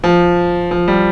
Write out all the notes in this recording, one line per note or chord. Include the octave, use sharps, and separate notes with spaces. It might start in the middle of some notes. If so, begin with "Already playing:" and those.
F3
F3
G3